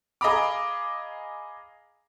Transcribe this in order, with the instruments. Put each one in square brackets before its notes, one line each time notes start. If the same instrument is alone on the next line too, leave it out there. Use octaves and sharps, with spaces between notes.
[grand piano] G#4 D#5 F5 A#5 B5 D6